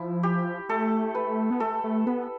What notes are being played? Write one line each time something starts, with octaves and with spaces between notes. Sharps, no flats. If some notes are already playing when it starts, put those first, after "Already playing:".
Already playing: F3 E4
G4
A3 A4
B4
B3
A3 A4
A3
B3 B4